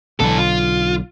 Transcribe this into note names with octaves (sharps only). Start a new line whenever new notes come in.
B1 D3 E3 A4
F4